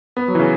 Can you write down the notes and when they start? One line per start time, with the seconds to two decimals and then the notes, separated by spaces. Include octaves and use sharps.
0.17 B3
0.28 F#3
0.35 E3
0.39 C#3